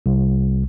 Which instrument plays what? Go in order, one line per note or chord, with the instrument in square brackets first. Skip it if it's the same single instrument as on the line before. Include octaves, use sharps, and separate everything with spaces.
[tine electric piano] C2